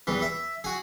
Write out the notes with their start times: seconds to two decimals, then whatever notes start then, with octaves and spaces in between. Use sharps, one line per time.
0.07 E2 G2 E3
0.22 E5
0.64 F#4 G#4